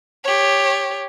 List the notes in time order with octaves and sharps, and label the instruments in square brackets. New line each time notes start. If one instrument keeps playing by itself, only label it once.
[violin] G4 C#5